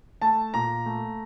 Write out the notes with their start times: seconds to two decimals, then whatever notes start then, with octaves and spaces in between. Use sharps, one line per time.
0.22 A3 A5
0.54 A#2 A#5
0.86 A3